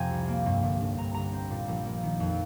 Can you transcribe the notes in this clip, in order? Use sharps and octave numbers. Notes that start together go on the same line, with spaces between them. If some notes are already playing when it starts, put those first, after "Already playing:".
Already playing: F2 C3 C4 G#5 A#5
C2
A#3
G2
G1
G1
G2 A#5
G1 A#5
C4
A#2
A#1
A#3
D#3
F2